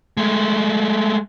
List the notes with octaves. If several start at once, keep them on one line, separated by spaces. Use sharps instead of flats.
G#3 A3